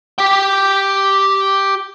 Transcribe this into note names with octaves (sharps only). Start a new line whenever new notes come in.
G4 G5